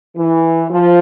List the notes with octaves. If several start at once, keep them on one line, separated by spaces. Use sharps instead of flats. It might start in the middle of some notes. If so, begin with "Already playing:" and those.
E3
F3